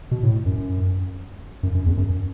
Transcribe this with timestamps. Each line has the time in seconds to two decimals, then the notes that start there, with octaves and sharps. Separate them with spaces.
0.11 B2
0.23 A2
0.46 F#2
1.63 F#2
1.75 F#2
1.86 E2
1.97 F#2